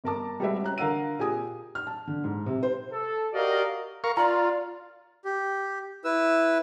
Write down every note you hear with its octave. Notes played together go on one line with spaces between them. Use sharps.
G1 A#4 A5 D6
G3 G#3 F#4 G4 B4 E5
C#4 A#5 F#6
D3 A#4 F5 F#5 E6 D#7
A#2 G4 G#4 G#5 D#6
F6
A5
D3
G#2
C3
C5
A4
F#4 G4 A#4 D5 D#5 F5
A#4 F5 C#6
F4 D5 A#5 C6
G4
E4 B4 E6